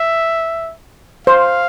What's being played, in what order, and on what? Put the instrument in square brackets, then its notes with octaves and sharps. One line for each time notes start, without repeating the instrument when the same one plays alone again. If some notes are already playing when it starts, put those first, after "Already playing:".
Already playing: [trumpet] E5
[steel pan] C5 [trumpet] F5